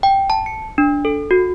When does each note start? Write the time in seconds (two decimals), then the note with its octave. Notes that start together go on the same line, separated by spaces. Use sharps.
0.03 G5
0.30 A5
0.46 C#7
0.78 D4
1.05 A4
1.31 F#4